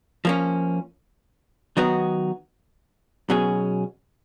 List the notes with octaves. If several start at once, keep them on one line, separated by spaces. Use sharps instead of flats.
F3 A#3 C#4
D#3 F#3 B3 D#4 F#4
B2 F#3 C#4 G#4